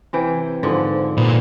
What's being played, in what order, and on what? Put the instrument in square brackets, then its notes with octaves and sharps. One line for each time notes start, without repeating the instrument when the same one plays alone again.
[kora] C3 E3 G5
G#2 D3 F3
[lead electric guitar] A#2 [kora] B3